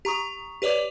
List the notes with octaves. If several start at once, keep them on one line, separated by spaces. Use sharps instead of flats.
G4 A#5 C#6 D#6
G4 B4 C#5 D5 D6